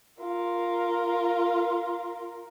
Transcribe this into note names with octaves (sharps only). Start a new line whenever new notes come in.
F4 A#4